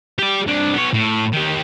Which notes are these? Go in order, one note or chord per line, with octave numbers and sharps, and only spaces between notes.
G4 D5
C2 D4
B3 C#5
A2
D#3 G4